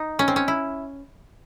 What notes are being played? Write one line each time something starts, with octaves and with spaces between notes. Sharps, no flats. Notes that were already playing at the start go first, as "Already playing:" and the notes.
Already playing: D#4
C#4
C4
C#4
E4